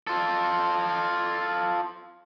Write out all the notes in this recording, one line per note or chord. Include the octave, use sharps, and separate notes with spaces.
F4 A4